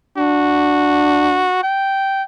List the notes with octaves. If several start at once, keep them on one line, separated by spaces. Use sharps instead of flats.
D4 F#4
G5